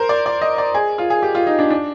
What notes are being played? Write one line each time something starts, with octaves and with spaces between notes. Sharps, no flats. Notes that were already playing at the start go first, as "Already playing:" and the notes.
Already playing: A#4 C5
D5
D5
D#5
D5
G#4
F4
G#4
G4
F4
D#4
D4
D4